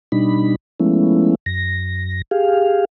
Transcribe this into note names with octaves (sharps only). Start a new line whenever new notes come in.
B2 G3 D4 D#4 B5
F3 G#3 A3 B3 C#4 E4
F#2 A#6
G4 G#4 F5